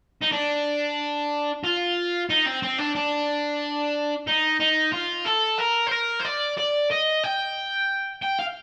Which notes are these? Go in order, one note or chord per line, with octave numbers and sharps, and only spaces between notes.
D#4
D4
F4
D#4
C4
C4
D4
D4
D#4
D#4
F4
A4
A#4
C5
A#4
C5
D5
D5
D#5
G5
G5
F5